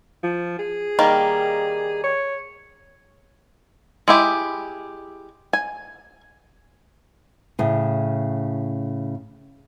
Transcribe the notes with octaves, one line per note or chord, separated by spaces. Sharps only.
F3
G#4
D#3 G3 A#3
C#5
G#3 E4 G4
G#5
A2 C#3